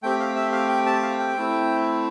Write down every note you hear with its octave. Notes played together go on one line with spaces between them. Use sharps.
A3 C4 G4 G5
F5
E5
F5
G5
A5
F5
G5
A3 C4 E4